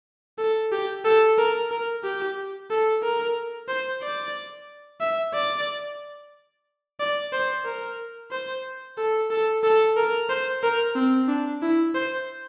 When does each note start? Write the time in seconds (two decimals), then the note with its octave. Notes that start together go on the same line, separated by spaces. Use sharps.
0.38 A4
0.72 G4
1.05 A4
1.38 A#4
1.71 A#4
2.04 G4
2.70 A4
3.03 A#4
3.69 C5
4.02 D5
5.01 E5
5.34 D5
7.00 D5
7.33 C5
7.65 A#4
8.31 C5
8.98 A4
9.30 A4
9.63 A4
9.97 A#4
10.29 C5
10.63 A#4
10.95 C4
11.28 D4
11.62 E4
11.95 C5